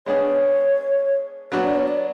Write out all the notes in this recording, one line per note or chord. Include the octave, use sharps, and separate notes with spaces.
G#3 B3 D4 G#4 C#5
F#3 B3 D4 F#4 C#5
D5
C#5
D5